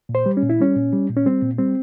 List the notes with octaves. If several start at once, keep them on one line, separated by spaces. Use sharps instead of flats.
A#2
C5
G3
C#4
A#2
E4
G3 C#4
A#2
G3
A#2
C#4
G3 C4
A#2
G3 C4